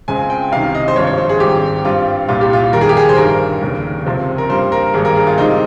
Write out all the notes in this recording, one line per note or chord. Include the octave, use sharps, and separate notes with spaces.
C#2 C#3 G#3 C4 G#5
G5
C2 C3 D#3 F5
D#5
C5
G#1 G2 F3 C#5
C#5
C5
G#4
G#1 G#2 G3 C4 G4
G2 G3 C4 F4
C2 A#2 G3 F4
G4
F4
F1 D#2 D#3 G3 A#4
G#4
G4
G#4
C5
G1 G2 D#3 G3 A#4
F1 D#2 C#3
C#2 C3 F3 C4
A#4
G2 G3 A#3 C5
A#4
G#1 G2 G3 A#3 G#4
A#4
G#4
F4
C#2 C#3 G3 C4 D#4